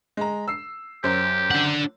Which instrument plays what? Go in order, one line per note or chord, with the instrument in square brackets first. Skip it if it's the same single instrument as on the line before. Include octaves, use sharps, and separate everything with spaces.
[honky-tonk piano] G#3 A#5
E6 C7
[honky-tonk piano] F#2 F#3 C5 [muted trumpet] G4
[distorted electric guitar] D4 F#5